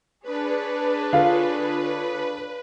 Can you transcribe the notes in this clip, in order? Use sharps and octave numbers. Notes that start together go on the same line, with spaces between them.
D4 G#4 B4 C#5
D3 F4 A4 F5